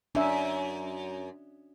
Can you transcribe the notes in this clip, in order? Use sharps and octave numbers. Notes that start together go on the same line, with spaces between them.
F#2 D4 E5